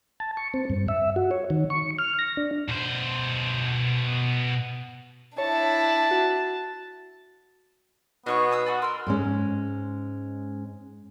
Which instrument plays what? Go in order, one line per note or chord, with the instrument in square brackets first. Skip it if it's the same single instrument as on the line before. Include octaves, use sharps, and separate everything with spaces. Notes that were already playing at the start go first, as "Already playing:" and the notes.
[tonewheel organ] A5
C#6
C4
G2
E5
F#4
C#5
D#3
C#6
F6
A#6
D4
[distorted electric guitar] B2 C5
[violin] D4 E4 [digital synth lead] C#5 [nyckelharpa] A5
[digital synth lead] F#4
[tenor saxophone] B2 [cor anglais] B3 [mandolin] D#4 C#5 C#6
[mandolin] G#5 D#6 E6
[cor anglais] F#4 [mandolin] D5 G#5 B5
[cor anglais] A#4 [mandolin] C6 E6
[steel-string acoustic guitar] G#2 G#3 C#4